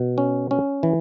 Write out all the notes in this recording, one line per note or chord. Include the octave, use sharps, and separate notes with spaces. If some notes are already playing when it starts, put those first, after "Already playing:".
Already playing: B2
C#4
C#4
E3